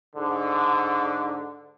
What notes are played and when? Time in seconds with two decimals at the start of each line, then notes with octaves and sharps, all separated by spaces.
0.15 G#2 D3